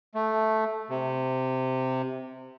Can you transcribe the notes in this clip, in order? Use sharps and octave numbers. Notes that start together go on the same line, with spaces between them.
A3
C3